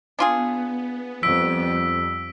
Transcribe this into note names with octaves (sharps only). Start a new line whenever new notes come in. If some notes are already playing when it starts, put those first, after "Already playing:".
B3 D4 F4 G#4
F2 G3 E6 B6 D7